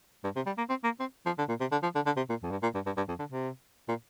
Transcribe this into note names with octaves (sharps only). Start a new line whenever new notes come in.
G2
C3
G3
A#3
C4
A#3
C4
F3
D3
A#2
C3
D3
F3
D3
D3
C3
A#2
F2
G2
A#2
G2
G2
G2
F2
D3
C3
A#2